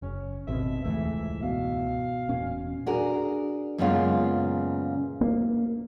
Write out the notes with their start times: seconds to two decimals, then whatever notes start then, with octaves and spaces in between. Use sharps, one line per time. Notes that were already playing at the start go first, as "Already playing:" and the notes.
0.02 F#1 C#4
0.47 G#1 D#2 B2 C4 E5
0.84 E1 C#2 G#2 E3 A3 E5
1.42 B2 F5
2.29 E1 A#2 C#4
2.86 D4 F#4 G#4 A#4
3.78 F#2 A#2 C#3 G#3 B3 F4
5.21 A#3